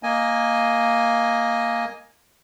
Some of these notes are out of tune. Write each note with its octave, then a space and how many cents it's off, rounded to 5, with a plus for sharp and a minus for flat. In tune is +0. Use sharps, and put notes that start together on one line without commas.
A#3 +0 D#5 +0 G#5 +0